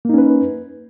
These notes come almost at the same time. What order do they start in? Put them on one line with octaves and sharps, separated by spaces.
A#3 D#4 C#4 B4